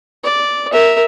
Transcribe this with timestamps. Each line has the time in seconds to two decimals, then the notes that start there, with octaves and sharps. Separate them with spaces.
0.24 D5
0.72 A#4 E5